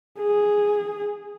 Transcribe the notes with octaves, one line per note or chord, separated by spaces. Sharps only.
G#4